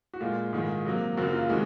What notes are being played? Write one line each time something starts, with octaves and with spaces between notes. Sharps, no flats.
F#4
A#2 G#3 F4
G#2 D#3 G#3
C3 F#3 A#3
F#2 C#3 F#3 A#3 F#4
F4
F4
C3 D#3 G#3 F#4